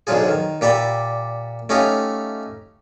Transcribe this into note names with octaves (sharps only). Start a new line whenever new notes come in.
B1 D3 F3 F#3 F4 G#4
D#3
A#2 G4 D5 E5 B5
A3 C#4 D#4 G4 F5 D#6